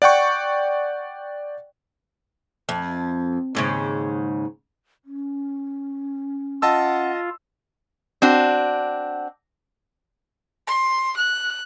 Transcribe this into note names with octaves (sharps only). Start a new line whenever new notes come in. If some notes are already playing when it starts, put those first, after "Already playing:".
D5 F#5 G5 C#6
F2
D#2 G#2 C#3
C#4
F4 D#5 F#5 A5 E6
C4 D4 F#4
C6
F#6